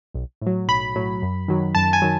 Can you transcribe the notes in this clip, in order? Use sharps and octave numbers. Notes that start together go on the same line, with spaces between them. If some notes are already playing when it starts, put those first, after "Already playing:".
B1
A2 F#3
B1 B5
A2 F#3
F#2
D#3 F#3
F#2 A5
G#5
D#3 F#3